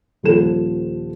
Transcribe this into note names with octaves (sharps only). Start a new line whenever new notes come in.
D#1 F3 A4 E7